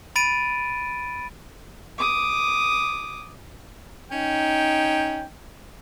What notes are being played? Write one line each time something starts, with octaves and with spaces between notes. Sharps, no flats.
B5 A6 D7 D#7
D6 D#6
C#4 D#4 G5